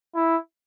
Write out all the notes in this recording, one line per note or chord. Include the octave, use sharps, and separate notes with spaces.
E4